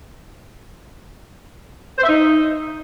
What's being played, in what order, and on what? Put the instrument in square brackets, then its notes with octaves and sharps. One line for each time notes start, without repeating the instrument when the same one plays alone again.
[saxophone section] C5
E5
D#4